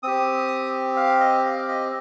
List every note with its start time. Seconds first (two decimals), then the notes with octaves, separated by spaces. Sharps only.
0.03 C4 G4 D#6
0.97 F5
1.20 D#5
1.45 F5
1.68 D#5